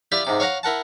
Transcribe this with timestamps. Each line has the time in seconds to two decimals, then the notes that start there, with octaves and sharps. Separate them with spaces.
0.12 E4 F4 G4 D5 G5 B5
0.25 G#2 C3 D6
0.40 C#5 F5 F#5 A#5
0.63 E4 A#4 F#5 A5